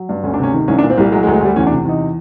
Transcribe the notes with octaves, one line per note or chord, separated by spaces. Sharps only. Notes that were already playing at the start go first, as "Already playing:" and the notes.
Already playing: F#3
G2
D2 C#4
C3 D4
C#4
D#3
C2 C#4
D4
A#2
C4
C2 G3
F#3 G#3
G#3
D2
G#3
D2 G3
E2 C#4
D4
C3
E2 D#4